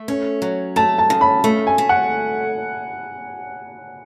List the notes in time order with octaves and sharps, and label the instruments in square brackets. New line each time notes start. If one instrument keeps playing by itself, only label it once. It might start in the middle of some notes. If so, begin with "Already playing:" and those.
Already playing: [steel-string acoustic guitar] A3
C#4
F#3
[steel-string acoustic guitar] A3 [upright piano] A5
[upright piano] A5
[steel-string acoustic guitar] C#3
[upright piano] B5
[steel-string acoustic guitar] A3
[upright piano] G#5
[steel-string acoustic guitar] A3
[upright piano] F#5